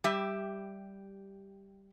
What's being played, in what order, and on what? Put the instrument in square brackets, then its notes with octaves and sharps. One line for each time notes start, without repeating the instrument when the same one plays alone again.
[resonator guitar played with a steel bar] G3 G4 E5